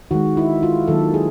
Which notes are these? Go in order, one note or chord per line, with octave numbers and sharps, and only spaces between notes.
D#3 G#3 F#4
E4
F4
D#3 F#3 A#3 A4
G#4